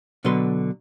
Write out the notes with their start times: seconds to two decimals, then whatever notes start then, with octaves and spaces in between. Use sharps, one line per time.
0.25 B2 D3 F#3 B4 C6